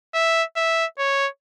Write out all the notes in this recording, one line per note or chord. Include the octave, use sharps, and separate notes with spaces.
E5
E5
C#5